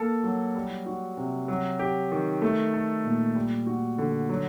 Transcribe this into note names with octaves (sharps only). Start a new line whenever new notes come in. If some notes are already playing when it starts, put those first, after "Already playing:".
Already playing: A#3 A4
F#3
G3
F#4
C3
F#3
G4
D#3
A3
A4
A#2
G3
F#4
D3
F#3